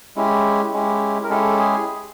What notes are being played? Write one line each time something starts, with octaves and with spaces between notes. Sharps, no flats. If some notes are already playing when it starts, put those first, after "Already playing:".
G#3 C#4 E4 G4
G#3 C#4 E4 G4
A#4
G#3 C#4 E4 G4 A4
G#4